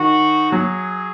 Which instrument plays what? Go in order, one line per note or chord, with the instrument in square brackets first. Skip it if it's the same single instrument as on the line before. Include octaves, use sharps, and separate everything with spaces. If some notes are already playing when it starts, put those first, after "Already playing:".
Already playing: [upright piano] D#3 [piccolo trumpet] F#4
[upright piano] F#3 [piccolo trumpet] G#4